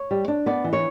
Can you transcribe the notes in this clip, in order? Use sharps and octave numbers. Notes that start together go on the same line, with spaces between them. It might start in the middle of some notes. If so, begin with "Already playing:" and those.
Already playing: C#5
G3
D4
B3 D5
E3
C#5